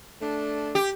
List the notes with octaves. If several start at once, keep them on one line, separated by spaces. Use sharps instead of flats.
A3 D4
G4